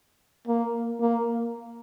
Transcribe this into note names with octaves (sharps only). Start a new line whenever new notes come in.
A#3
A#3